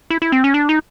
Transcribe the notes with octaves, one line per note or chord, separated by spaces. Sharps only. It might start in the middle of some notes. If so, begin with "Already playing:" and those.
E4
E4
C4
C#4
D4
D#4